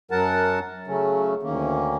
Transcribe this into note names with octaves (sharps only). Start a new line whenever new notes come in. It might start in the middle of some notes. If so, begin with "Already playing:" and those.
F#2 F#3 A#4 F#5 A5
C#3 F#3 A3 C#4
D2 D#3 A#3 C#4